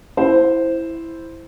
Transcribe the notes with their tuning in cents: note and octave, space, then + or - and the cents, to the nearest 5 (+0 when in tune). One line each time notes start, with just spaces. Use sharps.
E4 +0 C5 +0